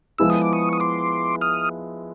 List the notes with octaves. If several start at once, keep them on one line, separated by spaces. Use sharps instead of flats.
F3 G#3 B3 E4 G#4 E6
D#6
D6
C#6 D#6
D#6
C6 D6
D#6 F6